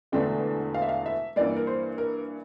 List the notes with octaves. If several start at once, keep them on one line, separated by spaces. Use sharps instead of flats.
E1 E2 D3 A3 D4 G5
F5
E5
F5
E5
G2 E3 A#3 D5
A#4
C5
A#4